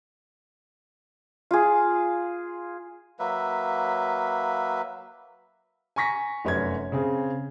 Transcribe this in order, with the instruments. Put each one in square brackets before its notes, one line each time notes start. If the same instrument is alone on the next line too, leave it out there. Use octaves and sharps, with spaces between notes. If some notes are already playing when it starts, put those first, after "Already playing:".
[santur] F4 G#4
[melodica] F#3 A#3 B4 E5
[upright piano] G#5 A#5 C#6 A#6 B6
F1 F#2 C#4 B4 G#6
C#3 C4 G#4